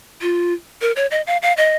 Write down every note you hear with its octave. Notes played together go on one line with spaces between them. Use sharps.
F4
A#4
C#5
D#5
F5
F5
D#5